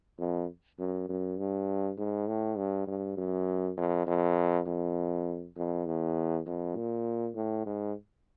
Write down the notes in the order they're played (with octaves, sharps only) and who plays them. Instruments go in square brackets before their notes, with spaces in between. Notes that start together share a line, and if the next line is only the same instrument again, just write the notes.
[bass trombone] F2
F#2
F#2
G2
G#2
A2
G2
G2
F#2
F2
F2
F2
F2
E2
F2
A#2
A2
G#2